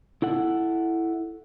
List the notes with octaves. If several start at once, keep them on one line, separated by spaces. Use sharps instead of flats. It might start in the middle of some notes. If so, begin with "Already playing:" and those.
E4 A4 F#5